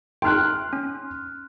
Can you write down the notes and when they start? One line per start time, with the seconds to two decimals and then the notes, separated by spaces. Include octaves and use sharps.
0.22 D#4 G5 C6 F6 F#6
0.73 C#4